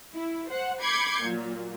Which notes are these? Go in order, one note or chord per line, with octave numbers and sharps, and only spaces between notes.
E4
C5 F#5
B5 D6 G6 G#6 C7 C#7
A#2 F#3